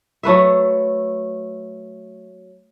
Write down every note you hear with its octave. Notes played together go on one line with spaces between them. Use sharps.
F#3 A3 B4 E5